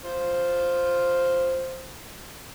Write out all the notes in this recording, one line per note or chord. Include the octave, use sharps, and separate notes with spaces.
F4 C5